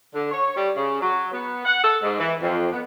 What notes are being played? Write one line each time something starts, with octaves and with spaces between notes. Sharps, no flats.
D3
C#5
G3
C#3
F#3
B3
F#5
A4
G#2
E3
F2
B3